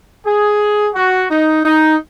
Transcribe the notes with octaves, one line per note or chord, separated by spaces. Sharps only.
G#4
F#4
D#4
D#4